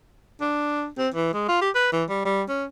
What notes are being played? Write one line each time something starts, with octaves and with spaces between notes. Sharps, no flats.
D4
C4
E3
G#3
F4
G4
B4
E3
G3
G3
C#4